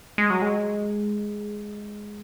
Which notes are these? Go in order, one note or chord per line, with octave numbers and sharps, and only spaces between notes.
G#3
F#3
G#3